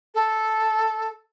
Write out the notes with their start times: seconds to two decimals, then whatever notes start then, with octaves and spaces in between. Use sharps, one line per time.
0.15 A4